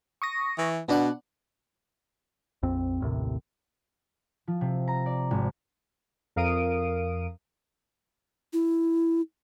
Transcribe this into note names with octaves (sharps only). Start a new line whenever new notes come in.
C#6 D#6 A#6
E3
B2 B3 D4 F#5
A#1 F2 C4
A1 D#2 A2 C3
F3
C3
A#5
D5
G#1
F2 A#4 F5 D#6 D7 D#7
E4